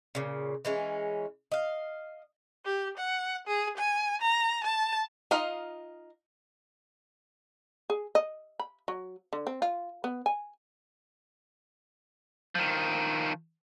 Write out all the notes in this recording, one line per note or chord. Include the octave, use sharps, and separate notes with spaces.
A#2 C#3
E3 G#3 C#4
D#5 F5
G4
F#5
G#4
G#5
A#5
A5
D#4 F4 D#5 F5
G#4
D#5
B5
F#3
D3
C4
F4
B3
G#5
D#3 F3